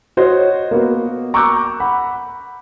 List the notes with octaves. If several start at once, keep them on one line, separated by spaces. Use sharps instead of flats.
F#4 C5 C#5 D#5
A#3 B3 F#4
A#5 C#6 D6 E6 F#6 G6
F#5 B5